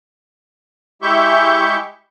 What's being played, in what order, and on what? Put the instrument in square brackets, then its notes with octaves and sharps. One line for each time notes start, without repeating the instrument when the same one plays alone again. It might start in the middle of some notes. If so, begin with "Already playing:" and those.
[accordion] G#3 E4 G4 E5 C#6 G6